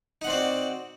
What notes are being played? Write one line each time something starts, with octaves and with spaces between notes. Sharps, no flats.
C4 D#4 F#4 D5 F#5